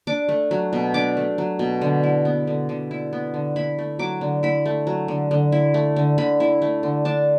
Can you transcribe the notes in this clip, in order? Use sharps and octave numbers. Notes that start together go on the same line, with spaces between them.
D4 D6
A3
F#3
B2
D4 D6
A3
F#3
B2
D3
E4
B3
D3
D3
E4
B3
D3
E4 B5
A3
F#3 D6
D3
E4 B5
A3
F#3
D3
D3
E4
A3
D3
D3 B5
E4
A3
D3
D4 A5